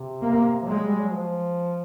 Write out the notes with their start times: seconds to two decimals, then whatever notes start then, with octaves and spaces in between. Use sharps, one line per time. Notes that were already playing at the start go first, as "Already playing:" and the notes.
Already playing: C3
0.22 A#3
0.62 F3
0.67 F#3 G#3
0.84 G3
0.99 F#3
1.14 F3